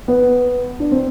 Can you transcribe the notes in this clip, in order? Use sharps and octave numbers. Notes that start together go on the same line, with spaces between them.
B3
D4
C4